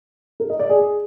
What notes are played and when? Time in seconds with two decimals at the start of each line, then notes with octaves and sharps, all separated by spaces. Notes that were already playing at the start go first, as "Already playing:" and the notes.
0.40 A#4
0.50 D#5
0.60 D5
0.69 G#4